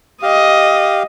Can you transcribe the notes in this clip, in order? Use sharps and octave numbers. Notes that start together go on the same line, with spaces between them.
G4 D#5 F5